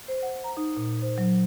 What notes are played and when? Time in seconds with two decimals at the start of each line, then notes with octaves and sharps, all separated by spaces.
0.08 C5
0.22 F#5
0.44 A#5
0.57 D#4
0.77 A#2
1.02 C5
1.18 F#3